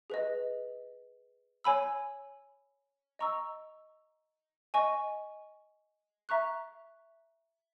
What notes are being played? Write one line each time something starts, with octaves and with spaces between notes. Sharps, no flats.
G#4 B4 D#5
C#5 G#5 B5 E6
D#5 A#5 C#6 E6
D#5 G#5 C#6
E5 A#5 C#6 F#6